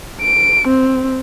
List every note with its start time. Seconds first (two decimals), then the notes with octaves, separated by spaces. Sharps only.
0.21 D7
0.67 C4